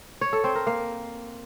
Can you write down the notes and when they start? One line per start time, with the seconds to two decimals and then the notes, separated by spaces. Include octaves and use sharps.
0.21 C#5
0.33 A4
0.44 C4
0.55 A#4
0.67 A#3